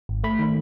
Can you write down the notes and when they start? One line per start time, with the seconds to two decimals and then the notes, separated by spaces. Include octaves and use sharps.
0.09 G#1
0.24 A3 B5
0.39 D#3